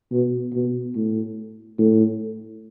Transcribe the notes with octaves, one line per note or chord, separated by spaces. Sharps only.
B2
B2
A2
A2